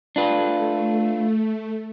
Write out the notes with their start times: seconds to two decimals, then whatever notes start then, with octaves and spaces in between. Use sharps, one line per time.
0.16 A3 D4 F4 B4